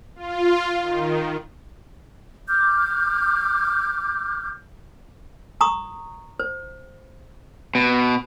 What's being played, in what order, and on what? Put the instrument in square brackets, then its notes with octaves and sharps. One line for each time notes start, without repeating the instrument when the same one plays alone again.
[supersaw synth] F4
D#3
[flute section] D6 F6 G6
[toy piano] A#5 C#6 D#6
C5
[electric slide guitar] B2